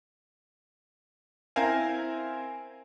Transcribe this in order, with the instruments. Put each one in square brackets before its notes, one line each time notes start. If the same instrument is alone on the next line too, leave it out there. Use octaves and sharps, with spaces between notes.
[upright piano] C4 E4 A#4 C5 F5 G#5